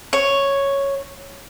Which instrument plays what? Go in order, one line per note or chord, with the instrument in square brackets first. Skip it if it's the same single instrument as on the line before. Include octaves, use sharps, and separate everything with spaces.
[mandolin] C#5